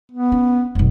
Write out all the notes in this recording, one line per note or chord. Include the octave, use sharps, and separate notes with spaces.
B3
C#4
F1 B1